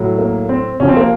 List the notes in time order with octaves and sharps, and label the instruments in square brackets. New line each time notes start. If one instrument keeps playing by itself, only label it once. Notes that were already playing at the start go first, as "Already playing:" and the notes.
Already playing: [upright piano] A2 F#3
A#3
C4
C3 F3 C#4
C4
A#3